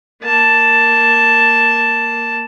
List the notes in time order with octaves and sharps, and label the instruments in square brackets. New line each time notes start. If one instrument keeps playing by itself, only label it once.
[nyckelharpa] A#3 A5